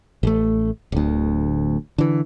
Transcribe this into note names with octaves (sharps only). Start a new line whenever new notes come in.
A1 A3
D1 D2
D3 E3